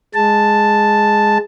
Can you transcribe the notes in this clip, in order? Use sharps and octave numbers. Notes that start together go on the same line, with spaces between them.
G#3 A5